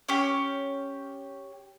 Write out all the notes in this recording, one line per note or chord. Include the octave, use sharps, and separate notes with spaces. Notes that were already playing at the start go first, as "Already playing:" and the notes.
C#4 G4